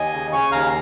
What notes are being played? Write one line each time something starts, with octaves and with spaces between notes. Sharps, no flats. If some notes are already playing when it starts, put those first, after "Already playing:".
Already playing: D#2 D#5 G#5
C#3
C#3 G#5 C#6
D#2 F5 A#5